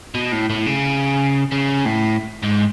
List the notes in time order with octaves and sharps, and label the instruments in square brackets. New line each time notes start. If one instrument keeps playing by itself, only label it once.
[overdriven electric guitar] B2
A2
A2
C#3
C#3
A2
G#2